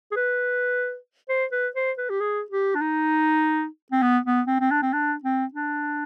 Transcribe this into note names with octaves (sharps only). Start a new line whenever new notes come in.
G#4
B4
C5
B4
C5
B4
G4
G#4
G4
D4
D#4
C4
B3
B3
C4
C4
D4
C4
D4
C4
D4